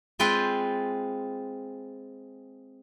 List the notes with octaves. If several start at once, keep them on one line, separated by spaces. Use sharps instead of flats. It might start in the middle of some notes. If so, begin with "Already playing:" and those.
G#3 C4 F4 B4 G5